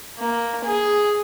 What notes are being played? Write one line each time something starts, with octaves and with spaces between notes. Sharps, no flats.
A#3
G#4